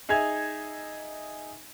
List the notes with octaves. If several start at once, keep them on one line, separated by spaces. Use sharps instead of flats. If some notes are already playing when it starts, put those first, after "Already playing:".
D#4 G#4 E5 G#5 G#6 F7